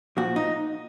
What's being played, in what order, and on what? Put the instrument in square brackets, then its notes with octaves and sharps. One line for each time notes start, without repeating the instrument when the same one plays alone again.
[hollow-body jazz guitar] A#2 F3 F#4
D#4